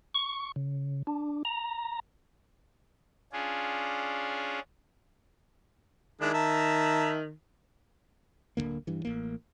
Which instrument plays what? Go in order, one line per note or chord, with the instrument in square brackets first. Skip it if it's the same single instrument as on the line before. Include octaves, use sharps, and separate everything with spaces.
[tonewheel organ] C#6
C#3
D4
A#5
[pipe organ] C#4 D4 F4 G#4
[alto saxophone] D#3 [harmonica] G#3 D4 E4
[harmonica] E5 A5 A#5
[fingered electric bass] D1 F2 D3 A#3
G2 E3
A1 A#3